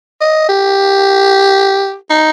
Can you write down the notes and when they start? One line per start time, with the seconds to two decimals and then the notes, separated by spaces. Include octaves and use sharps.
0.21 D#5
0.49 G4
2.10 D#4